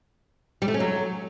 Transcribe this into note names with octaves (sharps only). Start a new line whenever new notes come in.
G3
A3
C#4
F#3